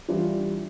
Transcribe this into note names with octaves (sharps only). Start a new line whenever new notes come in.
E3 G3 D4 F4